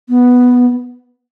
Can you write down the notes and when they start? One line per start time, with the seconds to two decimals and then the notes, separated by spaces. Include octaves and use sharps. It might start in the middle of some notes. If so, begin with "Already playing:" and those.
0.09 B3